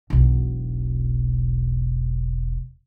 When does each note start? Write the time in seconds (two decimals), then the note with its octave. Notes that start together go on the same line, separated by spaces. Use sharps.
0.10 E1 B1